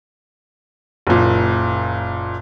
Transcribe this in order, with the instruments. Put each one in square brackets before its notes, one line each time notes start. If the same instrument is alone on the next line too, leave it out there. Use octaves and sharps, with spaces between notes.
[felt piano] F#1 A#2